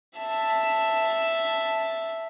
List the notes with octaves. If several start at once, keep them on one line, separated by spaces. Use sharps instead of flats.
E5 A5